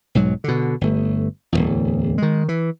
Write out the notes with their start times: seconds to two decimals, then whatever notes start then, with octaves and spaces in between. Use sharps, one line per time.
0.15 B1 G#2 F#3
0.44 B2 D3
0.81 G1 A3
1.52 D1 G1 E2
2.18 D#3 G#3
2.49 E3